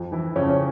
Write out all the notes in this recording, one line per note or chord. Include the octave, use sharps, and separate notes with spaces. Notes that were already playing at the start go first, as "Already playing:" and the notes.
Already playing: F2
E3 E4
F2 C#3 C#4
C#4